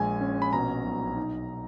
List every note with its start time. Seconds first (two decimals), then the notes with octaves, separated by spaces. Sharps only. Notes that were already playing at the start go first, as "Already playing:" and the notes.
Already playing: A#1 G#3 G#5
0.21 C#4
0.42 B5
0.53 B2 A#5
0.85 B1
1.17 D#4